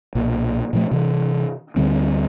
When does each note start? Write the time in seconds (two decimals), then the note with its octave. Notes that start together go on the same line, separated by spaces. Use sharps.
0.15 B1 A#2
0.73 A#2 F3 A3
0.91 C3 E3
1.76 D2 D3 G3 C4